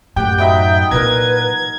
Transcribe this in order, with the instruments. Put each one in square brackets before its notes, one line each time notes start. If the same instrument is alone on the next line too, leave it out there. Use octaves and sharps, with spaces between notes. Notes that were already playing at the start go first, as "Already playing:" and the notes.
[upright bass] F#2 A2 [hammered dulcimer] G4 F#5 [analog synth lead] G5
[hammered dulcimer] F#3 B3 D#4 [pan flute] E5 [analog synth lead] G5
[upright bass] A#2 E3 [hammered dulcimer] A#4 A#5 [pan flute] B4 [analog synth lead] G#6